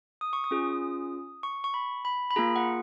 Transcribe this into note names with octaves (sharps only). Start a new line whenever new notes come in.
D#6
C#6
D#6
C#4 F4 G#4
C#6
C#6
B5
B5
B5
A#3 F4 G#4 A#5
F#5